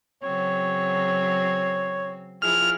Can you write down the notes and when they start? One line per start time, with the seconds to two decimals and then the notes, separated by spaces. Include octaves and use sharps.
0.23 C#3 F#3 C4 C#5
2.42 F3 E4 G#4 F6